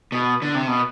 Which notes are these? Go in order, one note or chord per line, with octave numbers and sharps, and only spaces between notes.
B2
D3
C3
B2